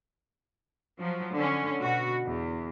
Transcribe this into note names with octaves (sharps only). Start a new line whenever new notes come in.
F3 F#3
D3 C#4
B2 F#4
E2